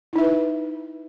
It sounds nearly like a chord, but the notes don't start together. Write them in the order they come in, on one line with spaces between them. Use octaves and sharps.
E4 D#4 E5 B4